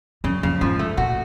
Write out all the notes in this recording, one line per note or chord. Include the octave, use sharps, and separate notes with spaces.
F#2 C#3
F2 C#3
G#2 F3
A3
A#2 F#4